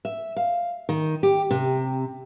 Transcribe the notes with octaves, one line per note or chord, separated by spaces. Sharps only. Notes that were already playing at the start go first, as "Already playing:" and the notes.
E5
F5
D#3
G4
C3